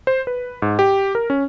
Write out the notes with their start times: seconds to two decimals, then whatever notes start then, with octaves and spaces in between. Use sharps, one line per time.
0.07 C5
0.27 B4
0.62 G#2
0.79 G4
1.15 A#4
1.30 C#4